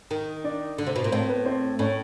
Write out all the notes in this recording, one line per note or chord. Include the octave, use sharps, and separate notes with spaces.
D#3
D4 D5
D3
C3
B2
A#2
A2 C4 C5
B3 B4
C4 C5
A2 C#4 C#5